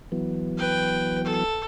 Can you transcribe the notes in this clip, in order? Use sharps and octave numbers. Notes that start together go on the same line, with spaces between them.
E3 F#3 B3
B4 G5
A4